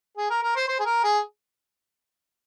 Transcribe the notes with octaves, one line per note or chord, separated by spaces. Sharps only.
G#4
A#4
A#4
C5
C5
G#4
A#4
G#4